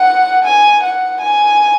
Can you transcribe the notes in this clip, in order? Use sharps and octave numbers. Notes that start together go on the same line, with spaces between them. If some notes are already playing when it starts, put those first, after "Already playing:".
Already playing: F#5
G#5
F#5
G#5